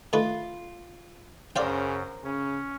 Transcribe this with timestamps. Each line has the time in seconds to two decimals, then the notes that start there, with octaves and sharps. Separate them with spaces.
0.13 D#3 A3 F4 B4
1.56 F#2 C#3 A#4 C5 D5 F5 G5
2.24 C#3 C#4